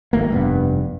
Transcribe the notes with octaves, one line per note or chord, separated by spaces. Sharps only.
G#1 A3 A#3
F1 G2 B3